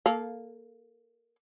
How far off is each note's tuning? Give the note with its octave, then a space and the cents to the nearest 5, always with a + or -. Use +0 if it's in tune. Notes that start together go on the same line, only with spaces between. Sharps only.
A#3 +0 A4 -20 F5 +0